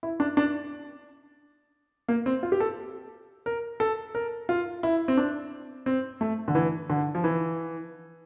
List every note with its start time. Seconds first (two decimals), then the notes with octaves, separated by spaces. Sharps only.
0.03 E4
0.20 D4
0.37 D4
2.08 A#3
2.26 C4
2.43 F4
2.52 G4
2.60 A4
3.46 A#4
3.80 A4
4.15 A#4
4.49 F4
4.83 E4
5.08 C4
5.17 D4
5.86 C4
6.21 A3
6.48 D3
6.55 E3
6.90 D3
7.15 F3
7.24 E3